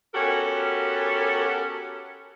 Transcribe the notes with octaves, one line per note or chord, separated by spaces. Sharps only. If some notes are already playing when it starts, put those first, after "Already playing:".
B3 C#4 F#4 G4 A4 A#4